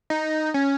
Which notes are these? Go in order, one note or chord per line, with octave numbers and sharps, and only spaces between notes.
D#4
C#4